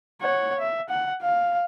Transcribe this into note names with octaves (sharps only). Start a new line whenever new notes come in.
C#5 F#5
E5
F#5
F5